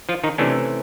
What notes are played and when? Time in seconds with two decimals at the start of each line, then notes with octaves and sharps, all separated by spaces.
0.09 F3 F4
0.24 D#3 D#4
0.38 C3 E3 A3 C#4 D4